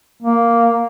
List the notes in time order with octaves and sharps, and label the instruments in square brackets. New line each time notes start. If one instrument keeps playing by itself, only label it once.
[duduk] A#3